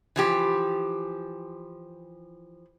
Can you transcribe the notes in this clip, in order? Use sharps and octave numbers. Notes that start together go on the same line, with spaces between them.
E3 F3 G4